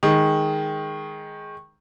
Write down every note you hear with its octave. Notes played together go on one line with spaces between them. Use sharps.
D#3 G#3